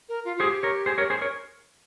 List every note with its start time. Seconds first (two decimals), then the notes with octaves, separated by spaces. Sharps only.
0.09 A#4
0.25 F4
0.36 F4
0.40 G4 G#4 C5
0.63 A#4 C#5
0.86 G#4 C5
0.98 A#4 C#5
1.10 G#4 C5
1.21 A#4 C#5